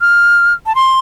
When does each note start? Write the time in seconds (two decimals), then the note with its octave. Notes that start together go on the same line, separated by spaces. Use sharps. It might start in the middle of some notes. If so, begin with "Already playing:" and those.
0.01 F6
0.66 A5
0.75 C6